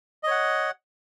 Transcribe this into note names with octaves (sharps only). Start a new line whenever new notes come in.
C#5 D#5 F#5